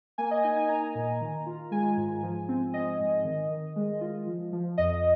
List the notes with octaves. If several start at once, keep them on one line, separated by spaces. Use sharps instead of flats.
A#3 G#5
D#5
D#4 G#5
G#5
D#4 A#5
A#2
D#3
F4
G#3 G#5
G#2
F3
C4
C4 D#5
G#2
D#3
D#3
G#3
F4
F3
F3
F2 D#5